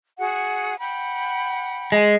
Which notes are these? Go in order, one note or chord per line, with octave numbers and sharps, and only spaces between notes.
F#4 G#4 F#5
F#5 G5 B5
G#3